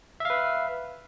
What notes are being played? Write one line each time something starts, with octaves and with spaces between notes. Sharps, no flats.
B4 E5 F5